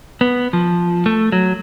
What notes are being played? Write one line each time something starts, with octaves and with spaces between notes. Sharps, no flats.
B3
F3
A3
F#3